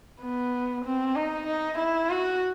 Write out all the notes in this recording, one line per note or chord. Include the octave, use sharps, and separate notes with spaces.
B3
C4
D#4
D#4
E4
F#4